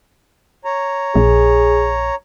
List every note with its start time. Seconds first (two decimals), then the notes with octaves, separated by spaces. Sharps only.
0.65 C#5 A#5
1.15 A#1 G#4